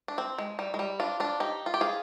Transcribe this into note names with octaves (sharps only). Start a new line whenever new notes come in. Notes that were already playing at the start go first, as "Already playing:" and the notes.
D4
C4
G#3
G3
G#3
G3
D4 F4
D4 F4
D#4 G4
F4
G4
F4 G#4